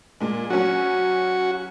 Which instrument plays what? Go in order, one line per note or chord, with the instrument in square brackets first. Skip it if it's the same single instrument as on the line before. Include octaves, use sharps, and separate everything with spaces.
[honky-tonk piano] A#2 G#3
[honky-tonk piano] F#3 C#4 [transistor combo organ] F#4